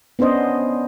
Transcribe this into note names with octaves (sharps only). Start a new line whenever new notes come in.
B3 C#4 D4 C5 D#5